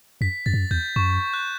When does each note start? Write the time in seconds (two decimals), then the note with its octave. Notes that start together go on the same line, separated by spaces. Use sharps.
0.21 F#2 B6
0.46 F#2 A6
0.54 G2
0.60 F#2
0.71 E2 G6
0.96 F#2 C#6
1.33 F#6